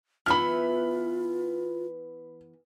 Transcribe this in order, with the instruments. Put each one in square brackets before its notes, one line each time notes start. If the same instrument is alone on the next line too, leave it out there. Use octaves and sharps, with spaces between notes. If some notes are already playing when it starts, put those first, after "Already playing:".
[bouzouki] E3 B3 E5 [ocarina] F4 [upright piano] B5 F6